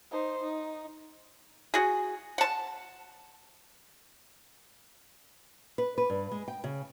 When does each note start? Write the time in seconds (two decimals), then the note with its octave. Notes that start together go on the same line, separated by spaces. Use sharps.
0.11 D#4 C5
0.42 D#4
1.74 F#4 G#4
2.38 F#5 A5
5.78 B4
5.98 B4
6.10 G2
6.31 G#3
6.48 G5
6.64 C#3